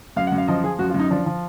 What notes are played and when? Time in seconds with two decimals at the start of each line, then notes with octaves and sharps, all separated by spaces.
0.16 F#2 F5
0.27 F#5
0.32 F#2
0.38 F5
0.48 F3 D#5
0.64 F3 G#4
0.79 F#2 F#4
0.90 F4
0.94 F#2
1.00 D#4
1.11 F3 D4
1.26 F3